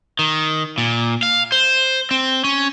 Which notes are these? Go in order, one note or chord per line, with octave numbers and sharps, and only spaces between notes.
D#3
A#2
F5
C5
C4
C#4